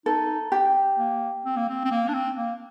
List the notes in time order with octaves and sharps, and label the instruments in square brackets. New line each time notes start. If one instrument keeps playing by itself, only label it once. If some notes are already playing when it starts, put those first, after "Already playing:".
[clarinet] D#4 [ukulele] A4
[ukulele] G4
[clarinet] A#3
C4
A#3
C4
C4
A#3
D4
C4
A#3